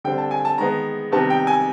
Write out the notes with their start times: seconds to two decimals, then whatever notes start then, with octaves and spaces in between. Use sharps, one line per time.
0.04 D3 G3 C4 G5
0.18 A5
0.31 G#5
0.45 A5
0.58 D#3 G#3 B3 A#5
1.12 C3 D#3 G3 B3 A5
1.30 G5
1.47 G#5